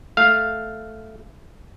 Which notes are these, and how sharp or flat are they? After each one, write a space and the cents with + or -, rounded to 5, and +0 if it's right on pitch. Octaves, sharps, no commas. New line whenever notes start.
A3 +0 F5 +0